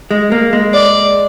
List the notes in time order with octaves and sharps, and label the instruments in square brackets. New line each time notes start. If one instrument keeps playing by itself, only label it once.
[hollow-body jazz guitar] G#3
A#3
G#3
[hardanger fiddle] D5